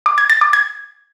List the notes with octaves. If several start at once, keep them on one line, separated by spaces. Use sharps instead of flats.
D6
G#6
A6
D6
G#6